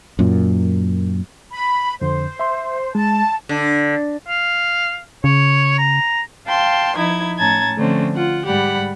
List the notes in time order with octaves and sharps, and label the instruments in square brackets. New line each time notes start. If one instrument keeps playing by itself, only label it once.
[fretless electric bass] F#2 A#2
[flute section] B5
[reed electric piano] F2 D3 [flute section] C5
[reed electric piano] E5 C6
[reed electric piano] G#3 [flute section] A5
[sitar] D3
[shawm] F5
[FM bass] C#3 [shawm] C#5
[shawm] A#5
[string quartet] F5 G5 A5 C6
F3 D#4 E4 G#6
A2 C#4 A5 A#5 G#6 A6
D3 F3 A3 C4 C#4
F4 F#5
G#2 G3 G4 F#5 B5